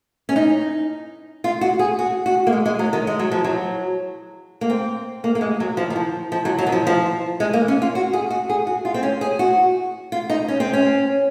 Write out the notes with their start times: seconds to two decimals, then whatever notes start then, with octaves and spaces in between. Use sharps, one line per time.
0.29 C#4
0.36 D#4
1.44 F4
1.61 F#4
1.79 G#4
1.99 F#4
2.26 F#4
2.47 A#3
2.52 G#3
2.66 G#3
2.79 F#3
2.93 D#3
3.07 G#3
3.19 F#3
3.32 F3
3.44 F#3
4.61 A#3
4.70 C4
5.24 A#3
5.35 A#3
5.41 G#3
5.60 F#3
5.77 F3
5.90 D#3
5.96 F3
6.32 F3
6.45 F#3
6.58 F#3
6.67 D#3
6.72 F3
6.87 F3
7.40 G#3
7.53 A#3
7.68 C#4
7.82 F4
7.95 F#4
8.13 G#4
8.31 F#4
8.50 G#4
8.67 F#4
8.85 F4
8.94 C4
9.03 C#4
9.21 G#4
9.39 F#4
10.12 F4
10.30 D#4
10.48 C#4
10.60 C4
10.73 C#4